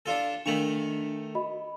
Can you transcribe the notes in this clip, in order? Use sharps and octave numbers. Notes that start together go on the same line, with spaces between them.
D4 F4 A4
D#3 A3 D4 C#6 F7 F#7
F#4 D#5 B5